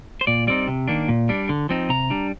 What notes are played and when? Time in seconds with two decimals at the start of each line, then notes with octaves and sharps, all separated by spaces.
0.21 C5
0.27 A#2 D5
0.47 G3 C4 D#4 D5
0.68 C3
0.88 D#3 A#3 D4
1.09 A#2
1.29 G3 D4
1.49 D3
1.69 F3 C4 D#4
1.89 C3 A#5
2.10 G3 D4